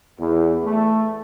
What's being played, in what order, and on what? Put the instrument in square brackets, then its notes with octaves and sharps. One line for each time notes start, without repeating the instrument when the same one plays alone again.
[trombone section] E2
A3